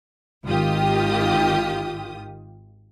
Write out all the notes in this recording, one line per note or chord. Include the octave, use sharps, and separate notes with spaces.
G#1 D#3 F4 G4 D#6